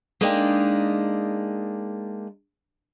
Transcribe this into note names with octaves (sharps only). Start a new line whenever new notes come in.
G#3 A#3 D4 D#4 G4